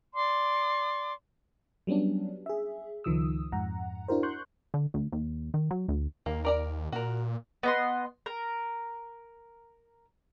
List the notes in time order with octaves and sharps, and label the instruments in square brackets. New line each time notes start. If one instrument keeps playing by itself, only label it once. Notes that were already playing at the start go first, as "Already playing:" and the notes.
[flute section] D5 C6 D6
[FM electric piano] F#3 G3 B3 C#4 D4
G#4 E5
C#2 D#3 F3 D#6 E6
F2 G#2 F#5 A#5
D4 E4 F#4 A#4 C5
C6 C#6 F#6 G6
[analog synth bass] D3
D2
D#2
D#3
F#3
D2
[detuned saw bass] D#2 [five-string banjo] A#3
[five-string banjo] A#4 D5 A#5
[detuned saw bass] A#2 [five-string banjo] F#4 A#4
[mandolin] B3 D#5 C6
A#4